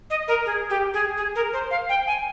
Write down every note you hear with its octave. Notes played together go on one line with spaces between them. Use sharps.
D#5
A#4
G#4
G4
G#4
G#4
A#4
C5
F5
G5
G#5